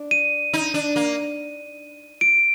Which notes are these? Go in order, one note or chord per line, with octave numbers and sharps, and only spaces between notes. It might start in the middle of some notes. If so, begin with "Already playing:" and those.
Already playing: D4
D#7
D#4
D4
A#3
D7